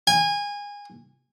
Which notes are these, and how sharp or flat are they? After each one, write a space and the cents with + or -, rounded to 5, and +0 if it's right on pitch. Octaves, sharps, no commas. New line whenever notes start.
G#5 -25